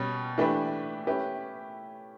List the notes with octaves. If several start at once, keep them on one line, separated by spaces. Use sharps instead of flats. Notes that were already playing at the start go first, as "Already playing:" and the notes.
Already playing: B2 G3 C#4
E3 A3 D4 G4 B4
A3 C#4 E4 G4 B4